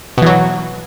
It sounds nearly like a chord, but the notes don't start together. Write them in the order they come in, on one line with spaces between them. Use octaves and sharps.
B2 E3 F#3